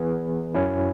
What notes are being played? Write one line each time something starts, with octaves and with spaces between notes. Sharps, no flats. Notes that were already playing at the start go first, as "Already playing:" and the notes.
Already playing: E3 B3 G#4 B4
F#2 F#3 C#4 E4